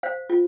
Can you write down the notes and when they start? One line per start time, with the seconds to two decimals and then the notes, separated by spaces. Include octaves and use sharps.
0.03 C5 F5
0.30 F4